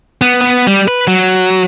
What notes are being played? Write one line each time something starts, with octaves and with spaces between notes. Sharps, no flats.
B3
B3
G3
B4
F#3